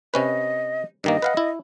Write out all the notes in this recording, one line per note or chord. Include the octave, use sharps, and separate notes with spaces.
C3 C#4 B4 D#5
G2 D#3 A#3 D#5
B4 F5 F#5
E4